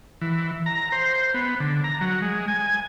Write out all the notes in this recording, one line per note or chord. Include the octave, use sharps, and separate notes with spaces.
E3
A#5
C5
B3
D3
A#5
F#3
G#3
G#5